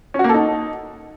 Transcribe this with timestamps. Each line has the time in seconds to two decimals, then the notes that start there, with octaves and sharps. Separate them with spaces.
0.14 C#4
0.19 F#4
0.24 A#3
0.29 A4
0.34 D#4